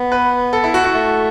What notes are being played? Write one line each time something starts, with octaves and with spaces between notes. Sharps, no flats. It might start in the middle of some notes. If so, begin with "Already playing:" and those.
Already playing: B3
B4
A4
E4
F#4
F#4
A3